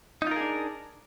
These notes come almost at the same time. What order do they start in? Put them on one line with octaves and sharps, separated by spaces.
D#4 F4 A#4 G#4 D4